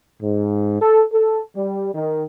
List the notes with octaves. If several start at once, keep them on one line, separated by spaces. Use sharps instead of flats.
G#2
A4
A4
G3
D#3